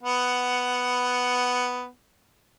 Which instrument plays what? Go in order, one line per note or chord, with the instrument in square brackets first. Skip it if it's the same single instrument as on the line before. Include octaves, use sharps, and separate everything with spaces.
[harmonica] B3 F#5